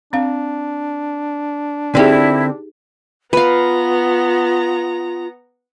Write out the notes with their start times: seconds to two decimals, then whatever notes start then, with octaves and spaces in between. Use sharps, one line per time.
0.13 C4 D4 F5
1.95 D3 C4 D#4 E4 G4 G#4
3.33 B3 F4 B4 F5 A#5